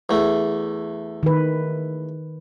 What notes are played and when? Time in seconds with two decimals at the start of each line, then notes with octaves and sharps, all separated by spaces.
0.09 E2 A3
1.23 D#3 B4